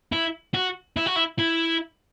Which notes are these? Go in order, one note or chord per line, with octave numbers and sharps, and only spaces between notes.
E4
F#4
E4
F#4
E4
E4